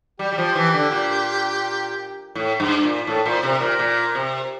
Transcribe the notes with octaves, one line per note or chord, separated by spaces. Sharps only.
G3 G4
G3
F3
E3
D3
A#2
A2
G2
A#2
A2 A4
A#2
C5
C3
A#4
A#2
A#2
C3